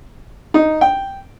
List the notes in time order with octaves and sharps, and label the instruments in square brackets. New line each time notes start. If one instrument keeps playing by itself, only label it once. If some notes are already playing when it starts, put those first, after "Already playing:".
[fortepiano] D#4
G5